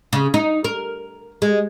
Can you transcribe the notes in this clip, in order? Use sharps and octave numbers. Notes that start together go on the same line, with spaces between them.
C#3
D#4
A#4
G#3